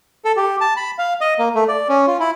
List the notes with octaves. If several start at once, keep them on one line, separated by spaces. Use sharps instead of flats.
A4
G4
A5
B5
F5
D#5
A#3
A3
D5
C#4
F4
E4